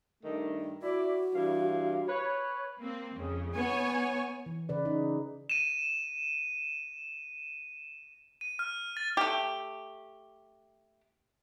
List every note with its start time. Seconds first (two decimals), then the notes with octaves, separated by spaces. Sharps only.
0.23 G2 D#3 A3
0.82 E4 F#4 D5
1.34 G2 E3 F5
2.08 B4 C#5
2.81 A#3 C4
3.15 F2 C#3
3.55 B3 C#5 G#5
4.46 E3
4.69 C#3 B4 D5
4.85 D#4
5.50 D#7 E7
8.41 D#7
8.59 F6
8.97 A6
9.17 A3 G4